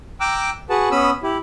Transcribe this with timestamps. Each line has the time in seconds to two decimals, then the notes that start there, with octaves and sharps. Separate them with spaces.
0.20 G5 A#5 D6 E6 F#6
0.70 F#4 G#4 B4 F#5 A5
0.91 B3 C#4 B5 D#6 E6
1.23 E4 G4